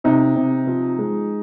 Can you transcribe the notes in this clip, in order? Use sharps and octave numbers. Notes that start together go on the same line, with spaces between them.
C3 D#4
C3
F3
G#3